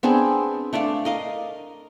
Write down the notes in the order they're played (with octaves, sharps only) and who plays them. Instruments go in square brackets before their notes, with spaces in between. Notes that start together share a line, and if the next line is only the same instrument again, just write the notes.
[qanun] B3 C4 D4 G#4
A3 D4 D5 F5
A#4 D#5 F5